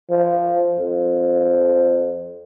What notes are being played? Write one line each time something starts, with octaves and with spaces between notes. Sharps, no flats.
F3
F2